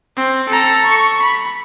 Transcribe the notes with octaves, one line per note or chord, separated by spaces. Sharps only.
C4
A4 A#5
C#6
B5